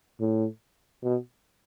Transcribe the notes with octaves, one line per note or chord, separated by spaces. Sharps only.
A2
B2